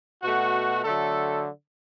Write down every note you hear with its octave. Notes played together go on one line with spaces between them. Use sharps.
B2 A3 F#4
D3 F#3 A3 A4